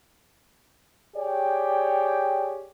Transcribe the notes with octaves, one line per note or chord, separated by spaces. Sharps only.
G4 G#4 C#5 D5 G5